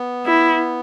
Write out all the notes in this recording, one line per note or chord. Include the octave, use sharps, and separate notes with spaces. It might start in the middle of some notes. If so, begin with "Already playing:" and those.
Already playing: B3
E4